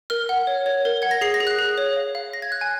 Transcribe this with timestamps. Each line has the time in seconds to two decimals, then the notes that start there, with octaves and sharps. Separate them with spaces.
0.10 A#4 F6
0.29 F#5
0.47 C#5
0.66 C#5
0.85 A#4
1.02 F#5 G#6
1.11 A#6
1.21 G#4 C7
1.34 A#6
1.40 G#4
1.47 F#6
1.59 G#4
1.78 C#5
1.96 F5
2.15 F5
2.33 F5 A#6
2.42 G#6
2.52 F5 F#6
2.61 G#5